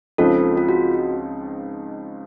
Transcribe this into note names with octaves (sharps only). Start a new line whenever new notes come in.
C#2 C#3 F3 C4 D#4 F4 A4
F4
F#4